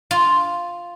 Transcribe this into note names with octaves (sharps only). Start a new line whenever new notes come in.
F4